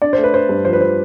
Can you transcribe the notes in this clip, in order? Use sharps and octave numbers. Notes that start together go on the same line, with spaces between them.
D4 D5
A3 C5
B4
A3 C5
G2
F3 C5
B4
F3 C5